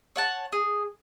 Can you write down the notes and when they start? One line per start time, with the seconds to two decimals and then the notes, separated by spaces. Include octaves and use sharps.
0.16 C#5 F#5 A5
0.52 G#4